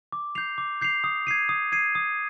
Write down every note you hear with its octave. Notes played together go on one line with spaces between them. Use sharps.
D6
G6 C7 F7
D6
G6 C7 F7
D#6
G#6 C7 D#7
D#6
G#6 C7 D#7
D#6